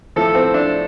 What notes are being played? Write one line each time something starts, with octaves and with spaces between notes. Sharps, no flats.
A2 F3 A4
C4
D4